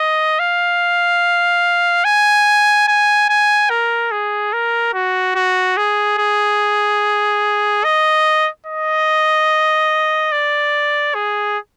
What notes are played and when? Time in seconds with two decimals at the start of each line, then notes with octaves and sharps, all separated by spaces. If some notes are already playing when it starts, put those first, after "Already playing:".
Already playing: D#5
0.39 F5
2.05 G#5
2.88 G#5
3.29 G#5
3.70 A#4
4.11 G#4
4.53 A#4
4.94 F#4
5.35 F#4
5.77 G#4
6.18 G#4
7.84 D#5
8.66 D#5
10.32 D5
11.15 G#4